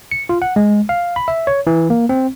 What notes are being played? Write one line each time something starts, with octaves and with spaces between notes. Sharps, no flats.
C#7
F4
F#5
G#3
F5
B5
E5
C#5
E3
A#3
C4